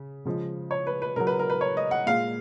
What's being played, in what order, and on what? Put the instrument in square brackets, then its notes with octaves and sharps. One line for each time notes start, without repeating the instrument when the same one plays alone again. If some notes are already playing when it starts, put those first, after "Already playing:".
Already playing: [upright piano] C#3
C#3 F3 G#3
C#5
B4
B4
C#3 F#3 A#4
B4
A#4
B4
C#5
D#5
F#5
A#2 G#3 F5